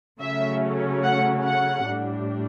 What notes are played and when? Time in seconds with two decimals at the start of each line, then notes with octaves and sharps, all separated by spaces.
0.20 C#3 F#3 A3 C#4 E5
1.03 F#5
1.44 F#5
1.86 A2 G3 D4